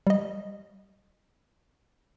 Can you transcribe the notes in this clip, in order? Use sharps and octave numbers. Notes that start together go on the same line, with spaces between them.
G3 D#5